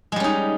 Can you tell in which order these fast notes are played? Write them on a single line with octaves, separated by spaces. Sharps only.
G#3 G3 C#4 D#4